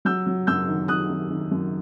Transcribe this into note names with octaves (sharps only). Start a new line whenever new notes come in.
F#3 E6 G6
F#3
F#2 E6 G6
D#3
D#3 D#6 F#6
D#3
D#3
F#2